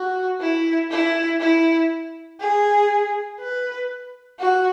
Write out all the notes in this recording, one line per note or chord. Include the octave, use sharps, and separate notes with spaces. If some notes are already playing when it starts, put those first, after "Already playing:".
Already playing: F#4
E4
E4
E4
G#4
B4
F#4